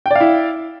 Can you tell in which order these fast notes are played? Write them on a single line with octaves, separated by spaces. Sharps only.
G5 D5 F5 E4